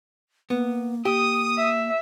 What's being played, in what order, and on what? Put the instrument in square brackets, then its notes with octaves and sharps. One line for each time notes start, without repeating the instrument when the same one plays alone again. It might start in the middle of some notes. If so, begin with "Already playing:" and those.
[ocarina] A#3 [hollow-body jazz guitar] B3
[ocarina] A#3 [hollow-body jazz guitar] G4 [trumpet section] D#6
[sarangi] E5